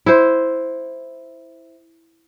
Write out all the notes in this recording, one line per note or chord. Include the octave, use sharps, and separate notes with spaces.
E4 C5